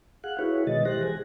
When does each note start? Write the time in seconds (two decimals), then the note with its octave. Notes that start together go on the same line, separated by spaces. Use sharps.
0.24 G#4 F5 F#5 F#6
0.39 E4 F#4 G#4 B4 C#5
0.67 B2 D#3 G#3 D#5 A6
0.85 E3 G4 C5 F#6 A#6
1.03 G#4 G#5